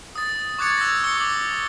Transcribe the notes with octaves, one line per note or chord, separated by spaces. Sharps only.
D#6 A6
C#6 D6 F#6 G#6 A6 C#7
E6 F#6 G#6 A#6
C#6 C#7 G7
D6 F#7